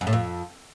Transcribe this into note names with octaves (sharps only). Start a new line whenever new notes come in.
F#2
A2
F2